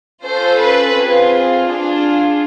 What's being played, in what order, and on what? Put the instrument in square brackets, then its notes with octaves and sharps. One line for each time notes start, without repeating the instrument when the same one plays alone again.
[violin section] C#4 F4 A4 C5
B4
C4 F4 G#4
D4 F4 G#4